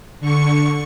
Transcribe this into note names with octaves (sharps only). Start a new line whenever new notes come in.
D3 C#6 C#7